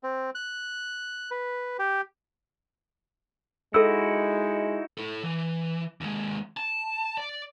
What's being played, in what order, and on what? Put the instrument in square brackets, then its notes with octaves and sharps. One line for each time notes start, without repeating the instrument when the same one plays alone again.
[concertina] C4
F#6
B4
G4
[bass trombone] G#3 [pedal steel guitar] D#4 E4 F#4 [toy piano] A4 E6
[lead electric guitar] E4 A4
E3
D#2 G#3
A5
D5